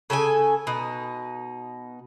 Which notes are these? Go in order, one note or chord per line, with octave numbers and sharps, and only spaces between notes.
C#3 A4 B4 G#5
B2 D#4